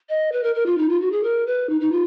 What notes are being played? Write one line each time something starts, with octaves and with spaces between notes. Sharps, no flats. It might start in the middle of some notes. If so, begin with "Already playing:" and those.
D#5
B4
A#4
A#4
F4
D#4
F4
F#4
G#4
A#4
B4
D#4
D#4
F4